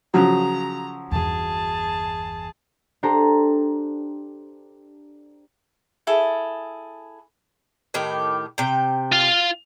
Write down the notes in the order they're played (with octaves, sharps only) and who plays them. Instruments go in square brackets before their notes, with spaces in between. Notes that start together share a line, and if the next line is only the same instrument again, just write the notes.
[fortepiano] C#3 F3 F#3 [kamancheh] A#5
[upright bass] G1 E2 [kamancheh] G#4 A5
[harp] D4 G4 A4 C5 A#5
[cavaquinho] E4 G#4 A4
[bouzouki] A2 D#3 G4
C3 G5
[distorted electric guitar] F4 F5